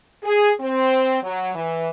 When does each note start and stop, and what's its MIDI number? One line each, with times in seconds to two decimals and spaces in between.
0.24 0.51 68
0.61 1.17 60
1.23 1.53 54
1.55 1.88 52